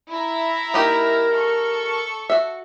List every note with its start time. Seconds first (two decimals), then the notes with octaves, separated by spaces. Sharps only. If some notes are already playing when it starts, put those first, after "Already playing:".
0.11 E4 E5 A#5
0.74 A#3 D#4 G4 A#4
1.35 A4 C#6
2.30 F#4 E5